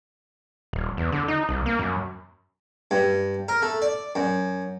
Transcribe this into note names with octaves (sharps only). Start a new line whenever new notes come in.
D#1
E2
D3
D#4
C2
A#3
F#2
G2
A#4
A3
D5
F#2